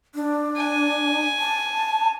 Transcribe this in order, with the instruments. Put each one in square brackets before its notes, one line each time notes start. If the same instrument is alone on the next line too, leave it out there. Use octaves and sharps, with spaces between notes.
[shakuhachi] D4
[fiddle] G#5
[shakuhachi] A5